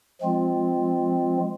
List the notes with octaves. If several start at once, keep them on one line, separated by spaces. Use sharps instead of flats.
F3 G#3 C4 F4